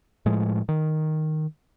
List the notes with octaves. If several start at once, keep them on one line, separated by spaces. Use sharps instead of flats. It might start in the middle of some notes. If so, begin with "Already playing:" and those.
A2 F3 G#3
D#3